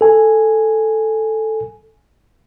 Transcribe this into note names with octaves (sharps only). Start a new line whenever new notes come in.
A4 G#5